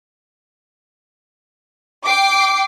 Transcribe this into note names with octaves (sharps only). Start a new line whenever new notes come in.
G5 D6 C7